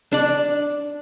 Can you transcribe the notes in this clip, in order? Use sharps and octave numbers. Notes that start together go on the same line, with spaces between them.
D4 D5